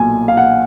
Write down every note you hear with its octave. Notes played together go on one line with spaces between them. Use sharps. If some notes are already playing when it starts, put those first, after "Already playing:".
Already playing: B1 A#2 G#5
F5
F#5